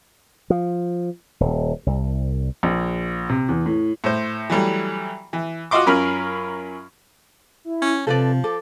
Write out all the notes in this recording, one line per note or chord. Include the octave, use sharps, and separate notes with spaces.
F3
D#1
C2
A#1
C3
E2
A2
A2 C5
E3 F#3 G3 A3
E3
F4 F#4 D#5 C6 D6
F#2 C#4 F4 A#4 B5 F6
E4
C#4
C3 F3 A4 B4 D5
A4 D6